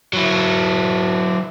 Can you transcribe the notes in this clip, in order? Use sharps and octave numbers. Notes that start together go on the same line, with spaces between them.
F#3 E4